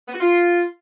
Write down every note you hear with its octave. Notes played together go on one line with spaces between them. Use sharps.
B3
F#4
F4